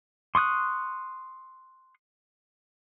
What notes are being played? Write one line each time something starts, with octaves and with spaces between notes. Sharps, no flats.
C6 C#6 D#6 F#6